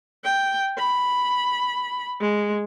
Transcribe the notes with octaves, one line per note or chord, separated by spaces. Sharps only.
G5
B5
G#3